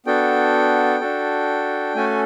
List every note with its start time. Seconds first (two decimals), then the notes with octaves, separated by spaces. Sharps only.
0.06 B3 D4 F#4 A4 G5
1.00 D4 F#4 A4
1.95 A3 C#4 F#4 A4 G#5